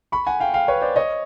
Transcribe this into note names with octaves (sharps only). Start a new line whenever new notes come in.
B5 C#6
F#5 G#5
F5 G5
F5 G5
B4 C#5
C5 D5
C#5 D#5